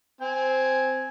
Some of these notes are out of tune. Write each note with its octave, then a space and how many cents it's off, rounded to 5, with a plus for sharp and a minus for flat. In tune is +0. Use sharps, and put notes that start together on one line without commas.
C4 -5 G#5 +0